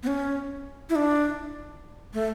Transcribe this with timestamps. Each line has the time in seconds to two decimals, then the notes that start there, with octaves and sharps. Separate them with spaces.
0.03 B3
0.07 C#4
0.90 E4
0.96 D4
2.14 A3